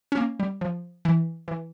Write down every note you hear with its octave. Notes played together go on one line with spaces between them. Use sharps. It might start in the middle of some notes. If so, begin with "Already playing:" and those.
C#4
A#3
G3
F3
E3
E3